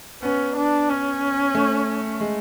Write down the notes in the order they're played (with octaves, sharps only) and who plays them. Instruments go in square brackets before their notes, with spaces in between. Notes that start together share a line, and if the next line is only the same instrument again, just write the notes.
[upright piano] B3 [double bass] C#4
[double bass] D4
C#4
[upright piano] A3
G#3